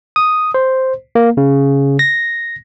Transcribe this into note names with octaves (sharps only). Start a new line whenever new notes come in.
D#6
C5
A#3
C#3
A#6